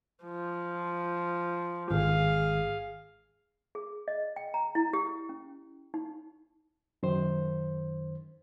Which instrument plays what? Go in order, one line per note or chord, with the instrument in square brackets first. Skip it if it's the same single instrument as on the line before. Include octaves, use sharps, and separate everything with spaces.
[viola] F3
[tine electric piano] G#1 [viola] G#4 F5
[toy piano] G#4
D#5
G5
A#5
E4
G4
C#4
D#4
[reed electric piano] F#2 D#3 C5